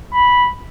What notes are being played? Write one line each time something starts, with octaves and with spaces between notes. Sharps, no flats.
B5